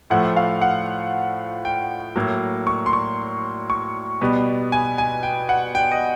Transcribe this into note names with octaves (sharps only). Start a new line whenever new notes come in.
A2 F3 A3 F#5
F5
F#5
G5
A2 F#3 A#3
C#6
C6
C#6
C#6
B2 G3 B3
G#5
G#5
G5
F#5
G5
D#5